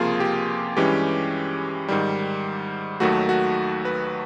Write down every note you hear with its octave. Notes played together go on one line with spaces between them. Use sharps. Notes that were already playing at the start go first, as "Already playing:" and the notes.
Already playing: C#2 C3 F3 A#3 F4 G#4
G4
G2 E3 G#3 C#4 G4
G#2 D#3 G3
D#2 D#3 F#3 A3 F#4
F#4
B4